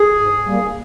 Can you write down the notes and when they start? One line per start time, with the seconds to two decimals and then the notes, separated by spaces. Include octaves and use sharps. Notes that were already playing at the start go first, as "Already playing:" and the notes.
Already playing: G#4
0.18 G#2
0.46 G3 A#3